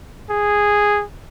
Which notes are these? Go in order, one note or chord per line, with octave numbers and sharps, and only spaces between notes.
G#4